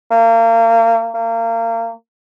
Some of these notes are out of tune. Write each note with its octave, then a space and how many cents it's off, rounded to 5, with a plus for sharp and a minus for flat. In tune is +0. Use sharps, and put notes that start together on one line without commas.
A#3 -35
A#3 -30